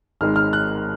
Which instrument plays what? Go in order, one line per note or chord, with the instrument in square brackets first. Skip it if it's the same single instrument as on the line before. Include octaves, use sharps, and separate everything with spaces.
[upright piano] G#1 G#2 D#3 G#3 F6
F6
F#6